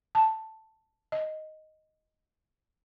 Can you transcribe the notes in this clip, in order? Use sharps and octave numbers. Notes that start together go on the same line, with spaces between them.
A5
D#5